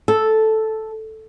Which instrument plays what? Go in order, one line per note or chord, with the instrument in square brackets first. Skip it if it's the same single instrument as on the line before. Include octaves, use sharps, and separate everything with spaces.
[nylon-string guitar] A4